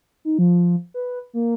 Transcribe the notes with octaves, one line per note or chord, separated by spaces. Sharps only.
D#4
F3
B4
A#3